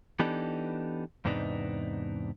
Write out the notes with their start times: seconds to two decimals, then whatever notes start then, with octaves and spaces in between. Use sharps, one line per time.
0.19 E3 B3 D4 D#4 G4 A4
1.25 E2 G#2 C3 B3 D4 D#4